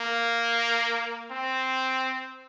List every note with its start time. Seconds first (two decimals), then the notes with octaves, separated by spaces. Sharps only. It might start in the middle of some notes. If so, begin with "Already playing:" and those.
Already playing: A#3
1.31 C4